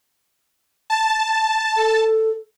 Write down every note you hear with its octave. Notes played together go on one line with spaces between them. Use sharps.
A5
A4